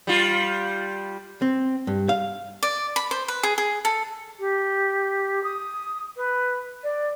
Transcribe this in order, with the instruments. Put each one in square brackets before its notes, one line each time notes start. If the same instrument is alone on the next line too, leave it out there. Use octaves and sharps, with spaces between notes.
[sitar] G3 F4
[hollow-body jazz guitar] C4
G2
F5
[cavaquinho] D5
B5
C5
B4
G#4
G#4
A4
[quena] G4
D#6
B4
D5